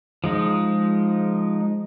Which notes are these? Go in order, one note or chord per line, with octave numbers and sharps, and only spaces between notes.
F3 G#3 D#4